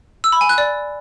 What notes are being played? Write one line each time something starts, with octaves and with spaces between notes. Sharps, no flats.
E6
B5
G#5
F#6
D5